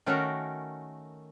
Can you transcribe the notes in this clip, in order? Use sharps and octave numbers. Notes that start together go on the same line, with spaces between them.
D#3 A3 C#4 F#4 A#4